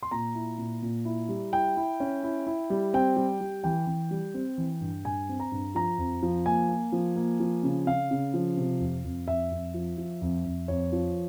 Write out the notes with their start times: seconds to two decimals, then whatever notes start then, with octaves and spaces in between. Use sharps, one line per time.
0.03 C6
0.11 A#2 A#5
0.35 E4
0.58 A#2
0.82 A#2
1.05 E4
1.29 G3
1.53 E4 G5
1.77 E4
2.00 C#4
2.23 E4
2.47 E4
2.70 G3
2.94 C4 G5
3.16 G3
3.41 G3
3.64 E3 G5
3.87 E3
4.11 G3
4.34 C4
4.58 E3
4.81 G2
5.05 G2 G#5
5.29 C4
5.40 A#5
5.52 G2
5.75 F3 A#5
5.98 F2
6.23 F3
6.46 A#3 G#5
6.69 A#3
6.92 F3
7.16 A#3
7.40 F3
7.63 C#3
7.86 C#3 F5
8.11 C#3
8.34 F3
8.57 C3
8.80 F2
9.04 F2
9.27 F2 E5
9.52 F2
9.74 F3
9.98 F3
10.22 F2
10.46 F2
10.68 F2 C#5
10.92 F3